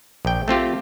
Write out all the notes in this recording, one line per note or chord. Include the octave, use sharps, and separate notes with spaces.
A#1 G5
A3 C4 F4 G4